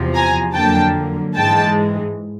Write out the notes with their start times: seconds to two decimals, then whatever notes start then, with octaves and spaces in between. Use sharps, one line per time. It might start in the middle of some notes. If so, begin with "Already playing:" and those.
Already playing: E2 C3 F3
0.14 G#5 A#5
0.55 F2 D3 F#3 A#3 G5 A5
1.35 G#2 E3 G#3 G5 A5